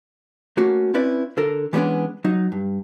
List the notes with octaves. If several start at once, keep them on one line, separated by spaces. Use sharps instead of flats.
A3 A#3 C#4 F#4
C4 C#4 E4 B4 D5
D3 A4 A#4
E3 G3 G#3 B3 C#4 D4
F#3 D#4
G2